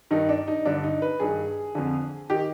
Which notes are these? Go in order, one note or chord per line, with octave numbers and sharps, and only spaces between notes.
G2 D#3 D#4
D4
D#4
G2 D3 D4
D#4
B4
G2 D#3 G#4
F2 D3
D#3 G4